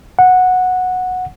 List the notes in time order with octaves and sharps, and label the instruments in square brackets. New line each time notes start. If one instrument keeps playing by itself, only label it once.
[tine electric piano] F#5